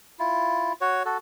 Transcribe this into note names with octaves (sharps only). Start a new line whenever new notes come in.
E4 F4
F#4 C#5
F#4 A4